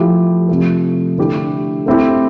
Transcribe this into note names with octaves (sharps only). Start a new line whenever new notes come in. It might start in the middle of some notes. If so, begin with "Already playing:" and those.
Already playing: F3 A3 E4 G4
C3 F3 A3
D3 A3 E4 G4
A3 C4 E4 G4